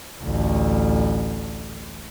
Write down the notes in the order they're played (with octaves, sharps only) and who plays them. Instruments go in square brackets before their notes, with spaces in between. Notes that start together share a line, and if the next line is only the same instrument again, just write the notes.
[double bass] A1 D2